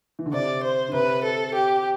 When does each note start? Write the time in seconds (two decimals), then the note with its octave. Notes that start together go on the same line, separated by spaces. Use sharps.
0.19 E3
0.26 D3
0.33 C3 D5
0.63 C5
0.88 D3
0.93 C3 B4
1.23 A4
1.54 G4